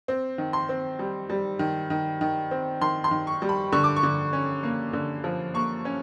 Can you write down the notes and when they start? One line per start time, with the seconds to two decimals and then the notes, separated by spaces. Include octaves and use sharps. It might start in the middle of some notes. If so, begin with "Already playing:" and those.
0.08 C4
0.38 D#3
0.53 C6
0.69 C4
0.99 G3
1.30 G3
1.59 D#3
1.90 D#3
2.21 D#3
2.51 C4
2.81 D#3 C6
3.04 C6
3.11 D#3
3.27 C#6
3.42 G3
3.49 B5
3.72 D3 C#6
3.84 D6
3.96 C#6
4.03 D3
4.33 C#4
4.63 A#3
4.93 D3
5.24 F3
5.54 A#3 C#6
5.85 C#4